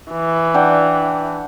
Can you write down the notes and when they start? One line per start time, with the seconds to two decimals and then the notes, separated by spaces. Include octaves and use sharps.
0.12 E3
0.54 D4 F#5 G5